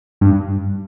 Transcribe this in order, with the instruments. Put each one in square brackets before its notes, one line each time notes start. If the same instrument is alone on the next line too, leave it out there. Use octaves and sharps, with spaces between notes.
[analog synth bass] G2